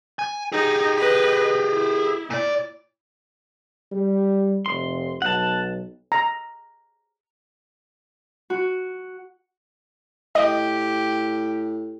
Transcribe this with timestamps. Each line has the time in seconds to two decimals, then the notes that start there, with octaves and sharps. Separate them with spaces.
0.19 G#5
0.52 D#4 G4 G#4
0.97 B4 D#5
1.72 E4
2.30 A#2 D5
3.92 G3
4.66 F1 C6
5.22 B1 F#5 A5
6.12 A#5
8.50 F#4
10.35 A2 G4 D#5